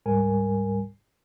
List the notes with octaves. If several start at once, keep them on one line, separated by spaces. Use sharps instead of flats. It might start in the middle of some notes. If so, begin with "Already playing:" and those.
C#2 G#2 G3 A#4 G#5